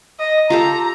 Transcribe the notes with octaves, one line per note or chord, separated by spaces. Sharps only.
D#5
F4 G4 A4 A#5